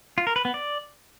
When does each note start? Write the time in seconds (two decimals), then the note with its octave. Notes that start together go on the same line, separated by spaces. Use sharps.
0.18 F4
0.27 A#4
0.36 B4
0.45 B3
0.54 D5